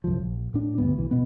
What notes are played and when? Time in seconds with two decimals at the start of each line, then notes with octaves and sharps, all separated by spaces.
0.04 C2 F#2 F3
0.22 A#1
0.54 A2 D4
0.78 D2 G2 F#3 B3
0.97 B1 E3
1.11 B2 B3